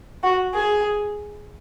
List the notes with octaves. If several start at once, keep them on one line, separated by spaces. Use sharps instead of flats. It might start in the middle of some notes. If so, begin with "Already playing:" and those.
F#4
G#4